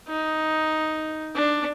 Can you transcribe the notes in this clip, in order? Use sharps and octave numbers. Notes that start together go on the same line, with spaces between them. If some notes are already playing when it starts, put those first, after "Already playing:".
D#4
D4